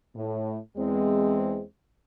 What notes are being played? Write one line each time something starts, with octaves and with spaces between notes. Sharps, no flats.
A2
E2 G#3 C4